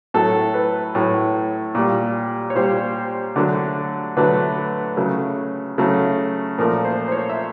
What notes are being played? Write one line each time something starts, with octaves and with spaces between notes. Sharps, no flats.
A2 F#3 A3 A4
B4
A2 F#3 A3
A#2 G3
C#5
A#2 G3 C5
D3 F#3 A3
D3 F#3 A3 B4
C#3 F#3 A3
C#3 F#3 A3
A#2 F3 A3 A#4
C5
C5
C#5
E5